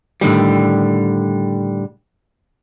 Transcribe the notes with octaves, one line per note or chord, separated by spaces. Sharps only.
A2 D3 D#3 G3